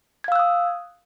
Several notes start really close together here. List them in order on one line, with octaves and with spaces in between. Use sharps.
G#6 F5 E6 F#6 D#6